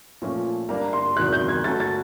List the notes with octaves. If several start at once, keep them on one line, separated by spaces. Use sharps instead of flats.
A#2 F3 A3 C#4
G3 A#3 D4 A#5
C6
E2 C3 D#3 F#3 F#6
G6
G#6
A3 C#4 F#4 A4 A6
A6